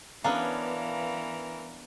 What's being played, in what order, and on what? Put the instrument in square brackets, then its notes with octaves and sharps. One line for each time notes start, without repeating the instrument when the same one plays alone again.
[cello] E3 A#4 [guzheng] B3 C#4 D4 [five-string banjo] G#4 A#5 [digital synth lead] F5